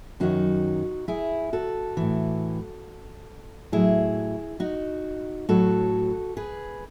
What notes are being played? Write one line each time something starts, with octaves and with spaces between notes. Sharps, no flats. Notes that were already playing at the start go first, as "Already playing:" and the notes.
F#2 D#3 F#3 D#4 F#4
E4 G#4
F#4 A4
A2 E3
A2 F#3 E4 G#4
D#4 F#4
A2 F#3 F#4 A4
G#4 B4